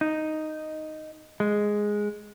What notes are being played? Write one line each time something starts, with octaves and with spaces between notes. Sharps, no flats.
D#4
G#3